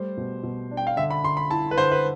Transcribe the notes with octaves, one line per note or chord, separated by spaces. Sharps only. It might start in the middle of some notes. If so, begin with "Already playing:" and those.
Already playing: G3 A3 C5
B2
B2
D4
G5
F5
D3 E5
B5
D3 C6
B5
E4 A5
B4
D3 C5
B4